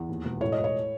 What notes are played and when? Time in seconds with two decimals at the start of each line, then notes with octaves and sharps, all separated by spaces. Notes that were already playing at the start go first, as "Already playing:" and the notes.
Already playing: E2
0.09 D#2
0.25 E1
0.41 A2 C#5
0.52 D#5
0.58 A2
0.64 C#5